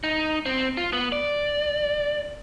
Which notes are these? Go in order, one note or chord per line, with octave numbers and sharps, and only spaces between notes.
D#4
C4
F4
B3
D5